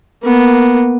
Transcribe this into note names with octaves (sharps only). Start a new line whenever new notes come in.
A#3 B3